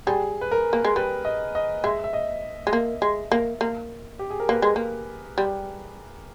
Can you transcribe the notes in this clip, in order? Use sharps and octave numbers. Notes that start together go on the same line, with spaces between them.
G3 G#4
B4
A#4
A#3
G#3
G3 B4
D#5
D#5
G#3 E5
E5
D#5
G#3
A#3
G#3
A#3
A#3
G4
G#4
A#4
A#3 B4
G#3
A#3
G3